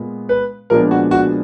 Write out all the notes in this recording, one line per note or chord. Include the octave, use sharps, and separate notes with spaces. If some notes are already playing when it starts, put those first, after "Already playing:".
Already playing: A#2 G#3 B3
B4
A#2 F3 G#3 B3 D4 A#4
F#4
F#4